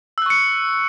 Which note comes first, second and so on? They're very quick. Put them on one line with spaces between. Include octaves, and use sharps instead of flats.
E6 F#6 C#6 C#7